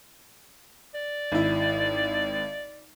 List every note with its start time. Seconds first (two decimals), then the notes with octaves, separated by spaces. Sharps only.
0.94 D5
1.32 G#1 E4